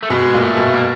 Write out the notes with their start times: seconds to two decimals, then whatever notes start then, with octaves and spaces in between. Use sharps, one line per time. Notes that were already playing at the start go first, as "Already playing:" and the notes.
0.03 A3
0.10 B2 G#3
0.34 A#2
0.41 A3
0.57 B2
0.73 A#3